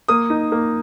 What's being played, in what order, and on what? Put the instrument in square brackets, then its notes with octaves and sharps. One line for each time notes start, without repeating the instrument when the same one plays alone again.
[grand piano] A#3 D#6
D#4
A#3